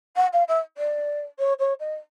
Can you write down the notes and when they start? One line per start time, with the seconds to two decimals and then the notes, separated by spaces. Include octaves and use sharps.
0.16 F#5
0.33 F5
0.48 E5
0.77 D5
1.39 C#5
1.59 C#5
1.79 D#5